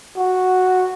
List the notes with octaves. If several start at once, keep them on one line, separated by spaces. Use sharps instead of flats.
F#4